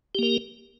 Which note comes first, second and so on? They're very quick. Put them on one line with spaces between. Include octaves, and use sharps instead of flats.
G4 A#3 A#4